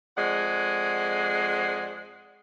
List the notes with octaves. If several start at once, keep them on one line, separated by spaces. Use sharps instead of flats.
F2 G#3 C5 D5 F#5